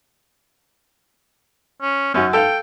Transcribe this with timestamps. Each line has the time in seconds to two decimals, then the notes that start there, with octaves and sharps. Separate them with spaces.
1.82 C#4
2.14 F#2 C#4 F#4
2.33 A4 F5 G5